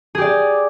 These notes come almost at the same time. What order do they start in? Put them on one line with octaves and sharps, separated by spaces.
G#4 G4 D5